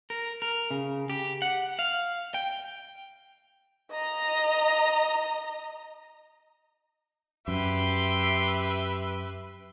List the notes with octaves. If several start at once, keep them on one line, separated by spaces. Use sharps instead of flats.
A#4
A#4
C#3
G4
F#5
F5
G5
D#5 A#5
F#2 G4 B4 E5 C6